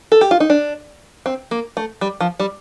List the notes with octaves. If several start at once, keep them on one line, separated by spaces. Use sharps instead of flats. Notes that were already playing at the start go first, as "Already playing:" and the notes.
A4
G4
F4
D#4
D4
C4
A#3
A3
G3
F3
G3